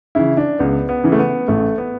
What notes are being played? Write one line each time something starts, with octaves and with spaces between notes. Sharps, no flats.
C#3 E3 E4
D4
C#2 B3
B3
C#3 E3
A3
B3
A1 A3
B3